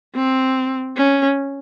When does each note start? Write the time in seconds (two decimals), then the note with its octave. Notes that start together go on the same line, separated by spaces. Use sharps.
0.15 C4
0.96 C#4